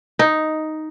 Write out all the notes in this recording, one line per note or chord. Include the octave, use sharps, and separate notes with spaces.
D#4